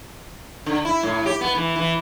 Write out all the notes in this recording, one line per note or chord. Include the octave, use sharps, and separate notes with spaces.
D3
E4
A2
G4
B3
E3
E3